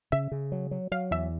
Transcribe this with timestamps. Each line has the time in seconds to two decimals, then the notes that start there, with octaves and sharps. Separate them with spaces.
0.12 C#3 E5
0.32 C#3
0.52 F#3
0.71 F#3
0.92 F#3 F5
1.11 E2 E5